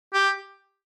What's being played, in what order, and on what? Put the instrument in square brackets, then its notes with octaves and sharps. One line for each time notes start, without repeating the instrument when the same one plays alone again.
[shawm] G4